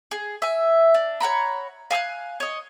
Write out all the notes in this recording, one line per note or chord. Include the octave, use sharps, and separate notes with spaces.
G#4
E5 G#5
D4
C#5 F#5 A#5 B5
F5 G#5 E6 F#6
C#5 D#5